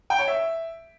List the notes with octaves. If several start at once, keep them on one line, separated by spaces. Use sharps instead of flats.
G5
C#5
E5